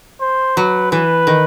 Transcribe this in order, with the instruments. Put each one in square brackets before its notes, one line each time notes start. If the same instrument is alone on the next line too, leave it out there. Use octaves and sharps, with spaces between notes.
[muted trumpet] C5
[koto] F#3 [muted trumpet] B4
[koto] E3 [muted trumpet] B4
[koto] D#3